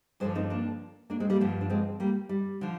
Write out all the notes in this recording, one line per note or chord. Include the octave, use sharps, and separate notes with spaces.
G2 D3 F3 G#4 C5
C4 D#4
A#3 D4
A#3 D4
G#3 C4
G3 A#3
G2 D3 F3
D4
G#3 C4
G3 A#3
G3
D3 F3